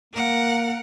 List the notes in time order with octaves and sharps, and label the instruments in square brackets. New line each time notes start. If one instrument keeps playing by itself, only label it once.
[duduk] A#3 [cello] A#4 F#5